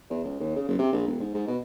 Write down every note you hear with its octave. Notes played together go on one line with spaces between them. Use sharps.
E2
C#2
D#2
C#3
F#1
C3
A#1
E1
G#2
G#2
B2